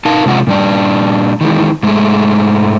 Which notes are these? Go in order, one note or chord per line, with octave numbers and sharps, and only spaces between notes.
D#4 A#4 F5 A5
C3 G#3 F4 F#5
A#2 G3 D4
D#3 E3 G#3
G#2 G#3 A3